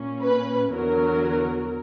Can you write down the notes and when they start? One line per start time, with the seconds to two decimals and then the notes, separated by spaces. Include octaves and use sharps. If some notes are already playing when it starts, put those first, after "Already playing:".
Already playing: A#2 A#3 C#4
0.23 B4
0.71 E2 D3 F#3 A#4